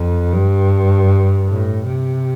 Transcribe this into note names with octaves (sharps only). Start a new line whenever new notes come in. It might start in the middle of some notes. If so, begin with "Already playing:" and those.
Already playing: F2
G2
A2
C3